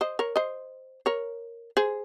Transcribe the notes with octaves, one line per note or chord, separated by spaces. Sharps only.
C5 D#5
A#4 C#5
C5 D#5
A#4 C#5
G#4 C5